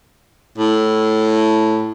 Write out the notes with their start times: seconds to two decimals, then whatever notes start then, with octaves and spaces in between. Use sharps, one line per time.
0.58 A2